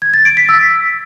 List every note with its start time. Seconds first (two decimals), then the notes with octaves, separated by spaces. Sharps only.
0.02 G#6
0.14 A6
0.25 D7
0.37 B6
0.49 E6